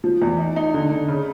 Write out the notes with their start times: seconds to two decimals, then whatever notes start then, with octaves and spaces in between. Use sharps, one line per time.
0.04 F3
0.22 E2
0.38 D#4
0.56 D#4
0.74 D3
0.91 D3
1.08 C#3